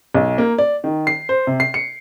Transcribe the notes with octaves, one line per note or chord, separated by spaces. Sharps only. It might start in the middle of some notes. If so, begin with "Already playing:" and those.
B1
A#3
D5
D#3
C7
C5
C3
C7
C#7